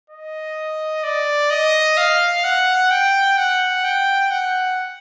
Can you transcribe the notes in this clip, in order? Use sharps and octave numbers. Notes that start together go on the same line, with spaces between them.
D#5
D5
D#5
F5
F#5
G5
F#5
G5
F#5